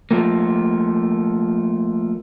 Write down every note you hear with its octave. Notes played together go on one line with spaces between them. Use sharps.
F3 A3 A#3